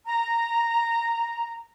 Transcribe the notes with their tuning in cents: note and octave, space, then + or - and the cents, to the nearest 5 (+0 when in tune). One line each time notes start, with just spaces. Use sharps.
A#5 -5